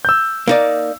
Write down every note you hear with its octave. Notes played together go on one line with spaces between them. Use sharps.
E6 G6
A#3 D#4 D5